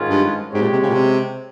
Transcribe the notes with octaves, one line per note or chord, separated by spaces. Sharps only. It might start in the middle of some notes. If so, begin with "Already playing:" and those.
Already playing: G#2 D#3 G#3 C#4 F4
G2
G#2 G#3 C4 G4 C#5
A#2
C3
C#3
A#2
C3